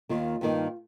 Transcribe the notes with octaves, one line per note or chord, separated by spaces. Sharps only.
D#2 D#3 A#3 F4
G2 D#3 A#3 D#4